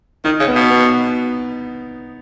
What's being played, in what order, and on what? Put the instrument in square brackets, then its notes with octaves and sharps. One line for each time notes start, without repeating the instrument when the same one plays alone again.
[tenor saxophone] D#3 [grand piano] D#4
[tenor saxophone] C#3
[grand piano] B3
[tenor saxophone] B2
[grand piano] B3